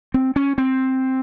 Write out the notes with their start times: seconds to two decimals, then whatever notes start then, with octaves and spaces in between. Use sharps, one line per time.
0.14 C4
0.36 C#4
0.58 C4